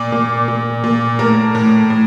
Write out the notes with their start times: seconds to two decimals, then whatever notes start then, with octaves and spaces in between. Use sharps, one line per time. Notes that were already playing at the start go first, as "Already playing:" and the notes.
Already playing: A#2 D5
0.12 A#2
0.48 A#2
0.84 A#2
1.19 A2 A#4
1.55 A2
1.90 A2